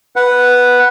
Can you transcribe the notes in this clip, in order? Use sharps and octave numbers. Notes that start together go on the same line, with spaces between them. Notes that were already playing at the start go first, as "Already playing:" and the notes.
B4 F#5